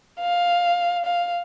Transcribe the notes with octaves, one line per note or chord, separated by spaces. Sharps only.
F5
F5